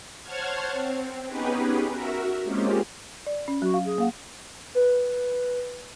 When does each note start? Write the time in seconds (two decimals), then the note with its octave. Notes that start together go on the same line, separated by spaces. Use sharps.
0.22 C5 C#5 F#5 A5 F6 G#6
0.71 C4
1.26 B3 C#4 D#4 G4 G#4 B4
1.89 F#4 A#4 E5
2.43 G#3 A#3 C4 C#4 F4 G4
3.27 D5
3.48 C#4
3.62 F#3 F#4
3.74 F5
3.86 G#4
3.98 A#3 F5 F#5
4.75 B4